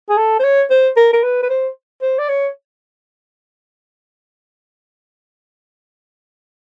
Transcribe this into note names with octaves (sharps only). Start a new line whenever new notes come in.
G#4
A4
C5
C#5
C5
A#4
A#4
B4
B4
C5
C5
D5
C#5